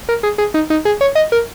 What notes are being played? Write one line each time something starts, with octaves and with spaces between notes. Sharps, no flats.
A#4
G#4
G#4
D#4
D#4
G#4
C#5
D#5
A#4